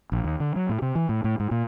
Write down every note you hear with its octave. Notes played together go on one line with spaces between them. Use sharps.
A#1
D#2
D3
F#3
A2
C3
E3
A2
A2
G#2
A#2